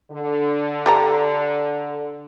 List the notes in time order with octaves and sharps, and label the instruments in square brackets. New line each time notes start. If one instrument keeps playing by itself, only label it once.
[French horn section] D3
[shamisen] G4 A4 A#5